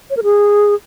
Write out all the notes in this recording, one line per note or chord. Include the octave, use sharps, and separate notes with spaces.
C#5
A#4
G#4